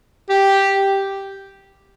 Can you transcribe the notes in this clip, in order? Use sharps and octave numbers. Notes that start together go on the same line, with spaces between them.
G4